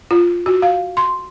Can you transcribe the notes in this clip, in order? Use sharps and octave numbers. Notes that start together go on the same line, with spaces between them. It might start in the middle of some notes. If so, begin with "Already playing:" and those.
F4
F#4
F5
C6